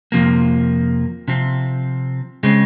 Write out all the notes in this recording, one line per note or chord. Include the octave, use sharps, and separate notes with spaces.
F2 C3 F3 A#3
C3 F3 C4
C#3 G#3 C4